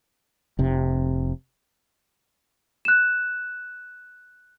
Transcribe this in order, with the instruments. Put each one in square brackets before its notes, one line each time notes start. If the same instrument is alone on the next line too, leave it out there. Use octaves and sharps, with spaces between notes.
[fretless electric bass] F1 C3
[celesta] F#6 E7